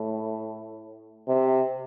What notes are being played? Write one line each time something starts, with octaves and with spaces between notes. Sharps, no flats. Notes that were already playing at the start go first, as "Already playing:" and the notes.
Already playing: A2
C3